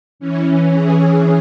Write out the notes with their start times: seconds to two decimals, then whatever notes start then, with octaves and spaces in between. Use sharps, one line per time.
0.19 E3 C#4
0.71 G#4